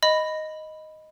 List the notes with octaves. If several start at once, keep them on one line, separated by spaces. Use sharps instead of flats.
D#5 B5